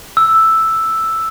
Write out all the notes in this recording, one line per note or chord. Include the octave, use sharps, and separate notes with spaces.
E6